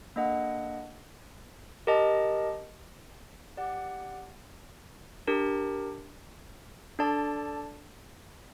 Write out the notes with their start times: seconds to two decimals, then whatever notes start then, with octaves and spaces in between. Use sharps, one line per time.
0.16 A#3 D4 A4 D#5 F#5
1.87 G4 A#4 D#5 A5
3.57 G4 D5 F#5
5.27 D4 G4 A#4
6.99 D4 A4 D5 A5